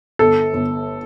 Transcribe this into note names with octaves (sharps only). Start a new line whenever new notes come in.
G1 A4
G1